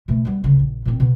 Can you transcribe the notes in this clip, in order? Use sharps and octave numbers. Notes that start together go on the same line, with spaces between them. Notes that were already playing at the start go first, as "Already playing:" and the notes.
B2 A3
G3 B3
D2 C#3
A#1
A#2 C4
B2